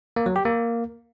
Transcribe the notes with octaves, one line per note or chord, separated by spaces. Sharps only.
A#3
F#3
G4
A#3